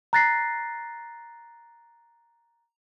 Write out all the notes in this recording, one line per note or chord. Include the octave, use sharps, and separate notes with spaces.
A#5 F#6 A6 A#6 C7